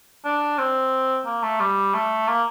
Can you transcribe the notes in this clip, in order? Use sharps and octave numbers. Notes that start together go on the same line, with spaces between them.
D4
C4
A#3
A3
G3
A3
A#3